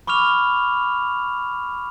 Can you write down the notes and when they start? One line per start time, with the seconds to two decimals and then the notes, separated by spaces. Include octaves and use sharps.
0.07 B5 C#6 D6 F6 F7